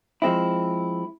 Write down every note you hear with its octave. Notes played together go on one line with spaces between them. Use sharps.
F3 G#3 C4 E4